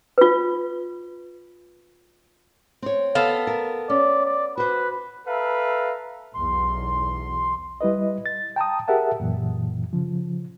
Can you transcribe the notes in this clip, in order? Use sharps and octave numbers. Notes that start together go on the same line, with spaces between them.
F4 B4
C4 C#5
B3 A4 F5
A#4
C#4 D5
D5
F#4 B4 C5
A4 B4 E5 F5 A#5
B1 E2 C6
G3 E4 B4 D#5
A6
G5 A5 A#5 D#6
G4 G#4 A#4 E5 F#5 A5
F#2 A#2 E3
C#3 F3